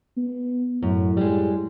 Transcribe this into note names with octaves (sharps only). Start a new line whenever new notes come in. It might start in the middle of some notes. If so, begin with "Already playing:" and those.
B3
F#2 A2
G3 G#3